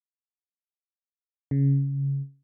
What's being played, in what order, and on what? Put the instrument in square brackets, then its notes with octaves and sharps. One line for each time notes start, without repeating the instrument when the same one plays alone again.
[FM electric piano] C#3